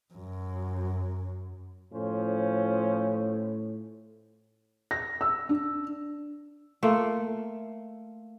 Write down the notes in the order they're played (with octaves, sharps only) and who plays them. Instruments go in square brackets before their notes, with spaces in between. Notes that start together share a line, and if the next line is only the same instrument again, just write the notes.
[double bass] F#2
[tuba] A2 [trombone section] F3 C#4 C5
[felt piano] A#6
E6
D4
[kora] A3 A#3 F4